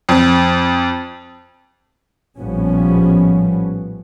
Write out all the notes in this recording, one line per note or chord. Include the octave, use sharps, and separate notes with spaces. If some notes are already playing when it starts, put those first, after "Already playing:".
F2
A#1 A2 F3 G3 B3 C#4